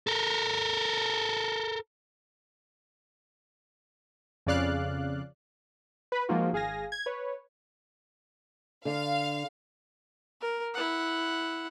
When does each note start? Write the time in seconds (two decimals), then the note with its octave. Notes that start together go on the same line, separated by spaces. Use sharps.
0.07 A4 A#4
4.47 F2 C#3 D5 F5 F#6
6.12 B4 B5
6.29 F3 G#3 A#3 D#4 F4 F#4
6.53 G#1 G#4 F5 G#5 A#6
6.92 G#6
7.06 B4 C#5
8.85 D3 F5
10.41 A#4
10.74 E4 F#5